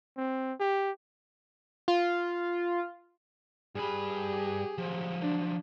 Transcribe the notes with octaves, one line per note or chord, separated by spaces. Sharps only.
C4
G4
F4
G2 G4 G#4 B5
F3 F#3
D4